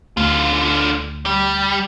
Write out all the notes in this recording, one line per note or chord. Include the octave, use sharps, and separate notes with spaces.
D2 D3 F4
G3